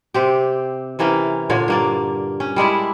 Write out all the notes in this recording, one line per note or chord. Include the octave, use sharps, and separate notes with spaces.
C3 C4 G4
C3 E3 A#3 C#4
A#2 D3 C#5
G2 A#3 D5
C#4
G3 G#3 D4 E4